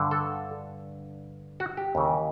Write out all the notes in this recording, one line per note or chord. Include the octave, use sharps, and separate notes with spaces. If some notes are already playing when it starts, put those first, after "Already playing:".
Already playing: G2 D3
A4
F#4
G4
D#2 C#3 E3